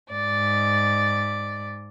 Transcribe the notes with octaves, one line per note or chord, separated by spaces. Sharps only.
G#2 D5